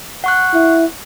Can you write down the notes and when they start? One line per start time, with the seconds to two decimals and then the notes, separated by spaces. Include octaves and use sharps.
0.24 F#5 C#6 F#6
0.54 E4